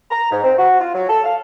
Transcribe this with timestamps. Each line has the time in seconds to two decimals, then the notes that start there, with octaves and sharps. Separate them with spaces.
0.11 A#5
0.31 G#2
0.44 C4
0.57 F#4
0.80 F4
0.95 F#3
1.09 A4
1.24 F5